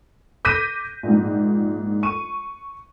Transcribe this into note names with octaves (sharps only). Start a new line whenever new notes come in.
D6 G6 A#6 B6 D#7
A#1 G#2
C#6 D#7